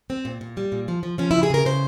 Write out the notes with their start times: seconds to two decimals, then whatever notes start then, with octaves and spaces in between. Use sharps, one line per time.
0.10 C4
0.25 A#2
0.41 A#2
0.57 G3
0.72 A#2
0.88 F3
1.03 F3
1.18 F3 C#4
1.31 C#3 E4
1.43 G#4
1.50 C#3 A#4
1.65 C#3 C5